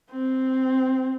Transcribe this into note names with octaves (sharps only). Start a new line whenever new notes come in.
C4